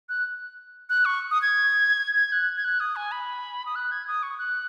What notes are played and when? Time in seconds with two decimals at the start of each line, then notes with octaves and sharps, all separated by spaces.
0.09 F#6
0.90 F#6
1.05 C#6
1.31 D#6
1.42 G#6
2.16 G#6
2.32 F#6
2.57 G#6
2.64 F#6
2.80 D#6
2.96 G#5
3.12 B5
3.66 D#6
3.75 F#6
3.92 G#6
4.07 D#6
4.23 C#6
4.38 F#6